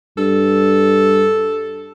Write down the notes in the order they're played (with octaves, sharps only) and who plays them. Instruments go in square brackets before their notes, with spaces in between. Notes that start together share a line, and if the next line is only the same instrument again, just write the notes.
[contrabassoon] G2 [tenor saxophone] A4